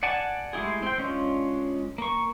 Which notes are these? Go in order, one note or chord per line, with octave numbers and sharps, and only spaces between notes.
D5 F#5 G#5 A5
G#3 A3 E4 G4 G#4
C4 G5
G#3 C#4 D4 F4
A#3 C#6